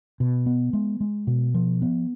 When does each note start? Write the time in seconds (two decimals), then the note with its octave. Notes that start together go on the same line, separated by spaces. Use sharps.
0.20 B2
0.46 B3
0.73 G#3
1.00 G#3
1.27 B2
1.54 F3
1.82 B3